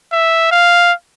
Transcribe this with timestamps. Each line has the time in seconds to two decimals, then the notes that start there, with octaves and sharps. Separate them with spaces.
0.12 E5
0.51 F5